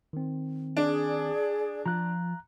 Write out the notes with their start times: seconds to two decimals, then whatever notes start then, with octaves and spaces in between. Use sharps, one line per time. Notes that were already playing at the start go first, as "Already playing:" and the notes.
0.13 D#3 C4
0.77 D4 G#4 D5
1.86 F3 F4 A#5 F#6